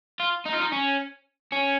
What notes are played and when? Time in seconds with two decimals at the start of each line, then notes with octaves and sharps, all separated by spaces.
0.20 F4
0.45 D#4
0.53 F4
0.60 D#4
0.72 C#4
1.52 C#4